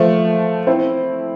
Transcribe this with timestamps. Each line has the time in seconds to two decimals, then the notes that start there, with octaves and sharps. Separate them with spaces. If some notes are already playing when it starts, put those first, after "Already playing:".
Already playing: F3 A3
0.67 C4 E4